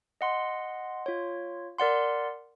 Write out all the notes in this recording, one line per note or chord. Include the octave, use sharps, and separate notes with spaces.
D#5 F#5 C6
F4 C#5
A#4 D5 F#5 C6